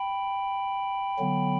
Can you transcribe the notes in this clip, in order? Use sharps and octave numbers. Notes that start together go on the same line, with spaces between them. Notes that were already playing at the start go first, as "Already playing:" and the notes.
Already playing: G5 B5
D3 F#3 B3